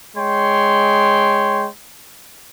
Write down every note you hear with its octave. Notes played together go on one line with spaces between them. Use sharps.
G#3 C#5 G5 C6